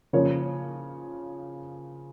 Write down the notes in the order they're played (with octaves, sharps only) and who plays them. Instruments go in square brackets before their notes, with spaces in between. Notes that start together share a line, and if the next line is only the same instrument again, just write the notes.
[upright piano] C#3 F3 A#3 C#5